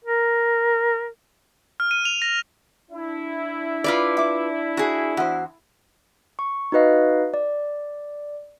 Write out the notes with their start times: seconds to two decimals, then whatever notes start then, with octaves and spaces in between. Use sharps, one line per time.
0.04 A#4
1.80 F6
1.91 D#7
2.05 F7
2.22 A#6
2.91 D4 E4
3.84 F4 B4 D5
4.17 E5 D6
4.77 F#4 G#4 C#6
5.17 E2 F#4 C5
6.39 C#6
6.72 D#4 F#4 B4 D#5 F5
7.34 D5